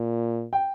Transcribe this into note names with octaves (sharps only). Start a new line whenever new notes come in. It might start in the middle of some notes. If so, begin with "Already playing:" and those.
Already playing: A#2
G5